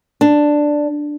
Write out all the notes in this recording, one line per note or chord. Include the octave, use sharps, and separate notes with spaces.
D4